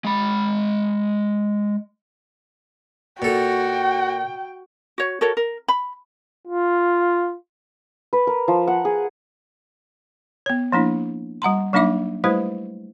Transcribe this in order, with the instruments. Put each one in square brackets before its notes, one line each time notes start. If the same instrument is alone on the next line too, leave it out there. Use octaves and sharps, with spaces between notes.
[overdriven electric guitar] G#3 B5
[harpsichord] A#2 A4 [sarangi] F#4 [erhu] G5
[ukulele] F#4 C#5
F#4 A4 A#4 C#5
A#4
B5
[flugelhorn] F4
[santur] B4
A#4
F3
F#5
G#4
[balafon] B3 C#5
F3 A#3 D4 E4
G3 F#5 A#5 C6
F#3 A#3 D4 D#4 E5 D6
G3 A3 E4 G4 B4 C5